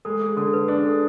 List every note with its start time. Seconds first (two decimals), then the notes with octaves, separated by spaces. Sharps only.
0.05 G#3 A4
0.21 G#4
0.37 D3 A4
0.53 B4
0.68 D4 G#4
0.84 A4